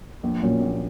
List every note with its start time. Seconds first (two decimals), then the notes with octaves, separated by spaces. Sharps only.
0.23 A#1
0.42 A#2 F#3 C#4
0.61 A#1